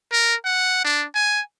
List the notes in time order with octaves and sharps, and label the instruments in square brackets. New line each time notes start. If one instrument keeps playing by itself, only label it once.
[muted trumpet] A#4
F#5
D4
G#5